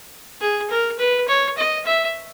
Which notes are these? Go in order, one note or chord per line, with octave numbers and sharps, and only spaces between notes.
G#4
A#4
B4
C#5
D#5
E5